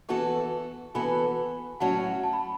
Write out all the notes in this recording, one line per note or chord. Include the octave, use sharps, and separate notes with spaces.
E3 B3 F#4 A4 A5 C#6
E3 B3 F#4 A4 G#5 B5
A2 F#3 C#4 F#4 F#5 A5
A5
B5